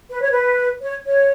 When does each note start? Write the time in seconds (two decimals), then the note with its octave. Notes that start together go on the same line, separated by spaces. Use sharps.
0.11 B4
0.22 C#5
0.32 B4
0.82 C#5
1.05 C#5